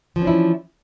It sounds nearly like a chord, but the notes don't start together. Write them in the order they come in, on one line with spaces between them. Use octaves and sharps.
F3 E3 C#4 D4 E4